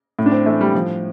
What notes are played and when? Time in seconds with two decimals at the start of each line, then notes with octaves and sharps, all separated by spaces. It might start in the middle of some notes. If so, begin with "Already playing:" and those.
0.19 A2
0.26 D4
0.32 C4
0.46 E3 A3
0.61 G3
0.74 A2 F3